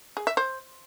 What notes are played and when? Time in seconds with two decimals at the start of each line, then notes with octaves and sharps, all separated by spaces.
0.17 G#4
0.27 E5
0.37 C5